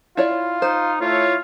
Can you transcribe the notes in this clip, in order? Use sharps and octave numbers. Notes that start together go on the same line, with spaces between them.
E4 F4 C#5 D5
D#4 C5
A3 E4 F4 C#5